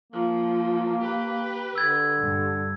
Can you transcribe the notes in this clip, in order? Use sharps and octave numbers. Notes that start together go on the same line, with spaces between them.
F3 A#3
G4 B4
D3 E6 G#6 A6
G2